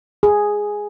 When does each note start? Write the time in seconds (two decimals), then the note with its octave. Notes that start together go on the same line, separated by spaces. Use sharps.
0.23 G#4